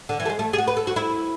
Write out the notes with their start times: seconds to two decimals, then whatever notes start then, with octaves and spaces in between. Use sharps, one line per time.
0.09 D3
0.20 E3
0.25 A3
0.29 G#3
0.39 A3
0.53 G#4
0.58 F#4
0.67 B4
0.77 A4
0.87 F#4
0.96 E4